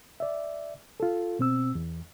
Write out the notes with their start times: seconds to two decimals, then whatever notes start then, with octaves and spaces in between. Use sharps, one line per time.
0.20 D5 E5
1.00 F4 A4
1.39 B2 C4 E6
1.75 E2